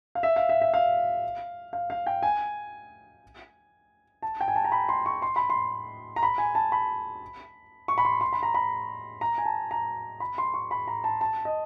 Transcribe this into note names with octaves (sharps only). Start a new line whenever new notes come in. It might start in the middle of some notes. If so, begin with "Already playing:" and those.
F5
E5
F5
E5
E5
F5
F5
F5
G5
G#5
A5
G5
G#5
A5
A#5
B5
C6
C#6
C6
B5
C6
A#5
B5
G#5
A5
B5
C#6
B5
C6
C6
B5
A#5
B5
A#5
G#5
A5
A#5
B5
C6
C#6
B5
A#5
A5
A5
D#5